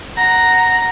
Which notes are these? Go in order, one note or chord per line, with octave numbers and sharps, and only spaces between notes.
F#5 A#5